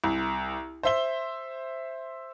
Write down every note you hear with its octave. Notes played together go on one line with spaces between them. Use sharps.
C2
C5 E5 G7